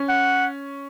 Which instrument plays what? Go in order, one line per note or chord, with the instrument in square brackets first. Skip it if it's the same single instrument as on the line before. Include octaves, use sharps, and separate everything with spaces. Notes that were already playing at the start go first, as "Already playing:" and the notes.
Already playing: [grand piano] C#4
[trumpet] F#5